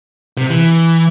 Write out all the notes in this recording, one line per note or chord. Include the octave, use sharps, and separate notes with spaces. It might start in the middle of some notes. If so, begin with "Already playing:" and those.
C3
E3